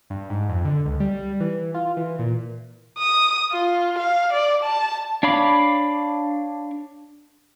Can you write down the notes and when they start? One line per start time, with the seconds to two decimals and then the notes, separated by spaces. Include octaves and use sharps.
0.10 G2
0.30 G#2
0.49 F2
0.65 D3
0.85 C#2
1.00 G3
1.40 E3
1.74 F4
1.97 E3
2.19 A#2
2.99 D#6
3.52 F4
3.99 F5
4.33 D5
4.63 A5
5.23 D4 C#5 F5 B5 D6